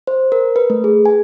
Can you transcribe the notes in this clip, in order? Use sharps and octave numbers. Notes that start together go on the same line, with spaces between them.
C5
A#4
B4
A3
G#4
G#5